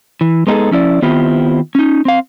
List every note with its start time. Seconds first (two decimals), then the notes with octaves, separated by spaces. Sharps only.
0.21 E3
0.47 G#3 B3 D#4 F4 G#4 A4
0.71 F3 C#4 E4 D5
1.02 D#3 B3 C4 E4 F4 G4
1.75 C#4 D#4
2.05 C4 F5